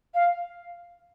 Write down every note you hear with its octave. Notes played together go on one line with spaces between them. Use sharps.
F5